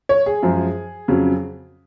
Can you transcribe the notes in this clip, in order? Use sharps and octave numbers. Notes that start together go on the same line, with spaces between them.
C#5
G#4
F#2 F3 G#3
F2 C#3 F#3